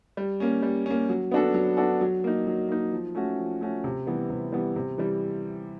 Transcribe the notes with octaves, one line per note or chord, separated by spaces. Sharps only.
G3
A#3 C#4
G3
A#3 C#4
F#3
B3 D4 F#4 A4
F#3
B3 D4 F#4 A4
F#3
A#3 D#4
F#3
A#3 D#4
F3
A3 C#4 F#4
F3
A3 C#4 F#4
C3
E3 G3 B3
C3
E3 G3 B3
C3
E3 G3